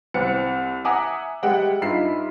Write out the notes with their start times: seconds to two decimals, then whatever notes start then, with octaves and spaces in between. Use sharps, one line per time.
0.14 C2 C4 C#7
0.85 E5 F#5 G#5 A#5 D6 D#6
1.43 G3 G#3 E5 F#5 G5
1.81 G2 D#4 F4 E5 C7